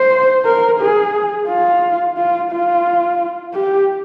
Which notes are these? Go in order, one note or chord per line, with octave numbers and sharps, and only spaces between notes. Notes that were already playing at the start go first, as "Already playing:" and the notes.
Already playing: C5
A#4
G#4
F4
F4
F4
G4